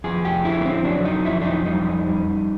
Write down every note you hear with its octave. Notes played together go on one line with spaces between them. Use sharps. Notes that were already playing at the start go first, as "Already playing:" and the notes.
F2 G#4
G4
D3 E4
B3
C4
F#3 D4
D#4
F2 E4
D4
D#4
G3 D#4
G3